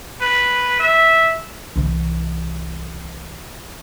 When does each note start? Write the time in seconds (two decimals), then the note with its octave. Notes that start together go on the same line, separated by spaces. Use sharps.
0.21 B4
0.80 E5
1.76 C2 E3